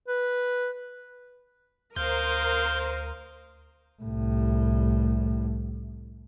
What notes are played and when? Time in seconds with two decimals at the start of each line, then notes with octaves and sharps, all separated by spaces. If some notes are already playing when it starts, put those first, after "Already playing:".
0.08 B4
1.96 D2 A#4 C5 F5 D#6 G6
4.02 C2 A2